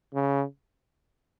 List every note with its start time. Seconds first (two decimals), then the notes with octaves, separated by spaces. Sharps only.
0.14 C#3